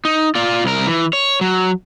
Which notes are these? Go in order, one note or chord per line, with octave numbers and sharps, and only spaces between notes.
D#4
F4 D5
C2 A#4
E3
C#5
F#3